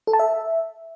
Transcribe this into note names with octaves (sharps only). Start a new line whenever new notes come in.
A4
A5
E5